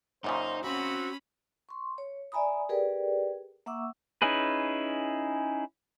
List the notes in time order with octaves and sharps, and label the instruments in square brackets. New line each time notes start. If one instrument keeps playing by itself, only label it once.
[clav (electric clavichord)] F#2 A#2 C#3 [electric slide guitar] D#4 [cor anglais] C5
[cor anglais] C4 [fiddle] C#4 B5 [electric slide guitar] F#4
[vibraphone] C6 C#6
C#5
D5 E5 G#5 A#5 B5 D#6
G4 G#4 A#4 B4 D5 G5
A#3 E5 F#5 C#6 D6 E6
[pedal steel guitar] C#4 D#4 E4 G#4 B4